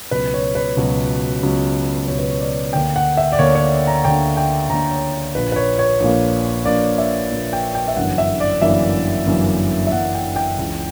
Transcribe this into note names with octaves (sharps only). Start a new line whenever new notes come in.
C#2 B2 F#3 B4
C#5
B4
C#2 B2 F#3
C#2 B2 F#3
C#2 B2 F#3 C#5
B4
C#5
D5
D2 D3 A#3 G5
F#5
E5
D5
D2 D3 A#3 C#5
C#5
A#5
D2 D3 A#3 G5
G5
D2 D3 A#3 A#5
C#5
A#1 A#2 A#3 B4
B4
C#5
C#5
A#1 A#2 A#3
A#1 A#2 A#3 D5
E5
A#1 A#2 A#3
G5
G5
E5
G1 F#2 E3 A#3 F#5
E5
D5
G1 F#2 E3 A#3 E5
G1 F#2 E3 A#3
E5
G1 F#2 E3 A#3 F#5
G5
G5
C#2 C#3 E3